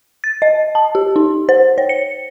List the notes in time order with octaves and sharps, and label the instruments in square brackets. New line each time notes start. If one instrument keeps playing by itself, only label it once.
[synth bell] A6
D#5
A5
G4
D#4
C5
C#5
C#7